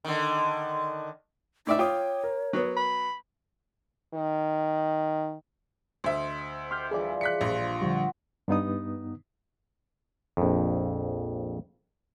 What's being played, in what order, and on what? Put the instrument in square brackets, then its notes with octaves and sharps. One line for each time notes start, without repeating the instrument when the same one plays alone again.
[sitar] D3 D#3
[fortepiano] A2 D5 E5 [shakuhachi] D#4
[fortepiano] F4 [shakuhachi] C#5 [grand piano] G5 D6 D#6
[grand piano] A#4
[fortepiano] F#3 B3
[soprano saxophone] B5
[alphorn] D#3
[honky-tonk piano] D2 E5 [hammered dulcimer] C5 D#5
[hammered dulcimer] G4 [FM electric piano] C6 F6 G6
[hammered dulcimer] E3 F3 G3 [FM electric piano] G#4 D5
[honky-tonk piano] F#6 B6 C#7
[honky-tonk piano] A#1 [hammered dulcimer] G2 F3 C6
[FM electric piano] D3 F3 G3 [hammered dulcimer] F#4 F#5
[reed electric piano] G2 B3 D#4 D#6
[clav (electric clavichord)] A#1 F2